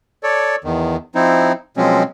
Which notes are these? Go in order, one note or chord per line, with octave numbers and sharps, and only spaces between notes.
A4 C#5 D5
E2 D#3
F3 C4 D#4 E4
B2 F3 F#3 G#3 C4 C#4